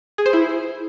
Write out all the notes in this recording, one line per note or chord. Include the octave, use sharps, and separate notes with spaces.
G#4
C5
E4